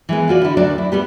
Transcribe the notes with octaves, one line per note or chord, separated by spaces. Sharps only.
E3 G#3 B3
F4 F#4 D5
D3 E4
D2 F#3 D4 D5
E4
G3 B3 G4